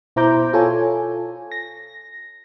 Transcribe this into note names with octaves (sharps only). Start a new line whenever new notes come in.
B2 E4 C5 A#5 D6 G6
F4 A4 C#5 G#5
A#6